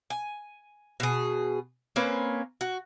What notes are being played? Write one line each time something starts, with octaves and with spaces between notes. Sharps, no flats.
G#5
B2 G#4
A#3 C4 C#4 B4
F#4